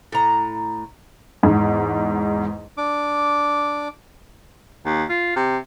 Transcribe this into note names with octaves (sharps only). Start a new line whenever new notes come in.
A2 A#5
E2 G#2
D4 D6
D#2
F4
C3